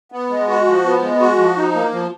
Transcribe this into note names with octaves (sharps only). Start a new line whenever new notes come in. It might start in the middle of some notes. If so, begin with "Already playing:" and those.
B3
G#3
F#4
F3
B3
G#3
F#4
F3
D#4
A#3
F3